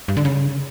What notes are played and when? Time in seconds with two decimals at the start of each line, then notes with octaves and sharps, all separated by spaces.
0.08 G2
0.17 D3
0.25 C#3